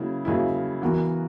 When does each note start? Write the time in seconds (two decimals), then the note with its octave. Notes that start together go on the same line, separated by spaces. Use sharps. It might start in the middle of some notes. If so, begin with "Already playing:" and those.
Already playing: C#3 F#3 A#3 E4
0.25 C#3 F#3 A#3 E4
0.82 E3 B3 F#4 A#4